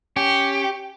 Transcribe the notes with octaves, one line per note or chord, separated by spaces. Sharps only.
C#4 G4